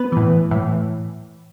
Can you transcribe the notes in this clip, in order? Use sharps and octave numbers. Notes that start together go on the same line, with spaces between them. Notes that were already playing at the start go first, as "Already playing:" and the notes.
Already playing: B3 B4
A2 E3
A2 E3